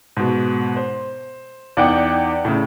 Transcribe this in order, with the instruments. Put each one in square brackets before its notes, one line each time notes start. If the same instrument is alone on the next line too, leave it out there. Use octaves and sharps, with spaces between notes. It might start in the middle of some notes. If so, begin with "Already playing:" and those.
[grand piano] G#2 B2
C5
[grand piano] E2 D#4 D6 [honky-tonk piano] D5 F#5 G5
[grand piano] A2 C#3